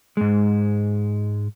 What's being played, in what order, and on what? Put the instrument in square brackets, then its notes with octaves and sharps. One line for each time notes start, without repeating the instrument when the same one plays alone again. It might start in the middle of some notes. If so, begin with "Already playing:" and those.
[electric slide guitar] G#2 G#3